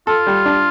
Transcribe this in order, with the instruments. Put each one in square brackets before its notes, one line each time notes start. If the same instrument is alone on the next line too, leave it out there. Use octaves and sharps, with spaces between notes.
[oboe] F4 [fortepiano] A4
[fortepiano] G3
D4